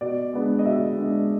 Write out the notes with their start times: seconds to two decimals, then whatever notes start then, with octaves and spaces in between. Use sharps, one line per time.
0.01 B2 D5
0.33 G#3 B3 D4
0.59 D#5
0.66 B2 E5
0.97 G#3 B3 D4